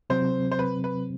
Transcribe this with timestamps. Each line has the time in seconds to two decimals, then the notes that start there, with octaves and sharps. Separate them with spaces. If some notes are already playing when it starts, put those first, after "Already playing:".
0.10 C3 F#3 C4 C5
0.52 C5
0.59 B4
0.84 B4